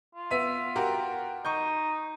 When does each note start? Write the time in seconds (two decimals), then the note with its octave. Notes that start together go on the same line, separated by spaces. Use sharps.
0.15 F4
0.31 B3 E5 D#7
0.76 F#4 G4 A#4
1.45 D#4 C#6 G6